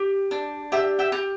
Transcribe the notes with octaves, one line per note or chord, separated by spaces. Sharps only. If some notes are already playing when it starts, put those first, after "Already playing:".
Already playing: G4
D4
G4 E5 G5
E5 G5
G4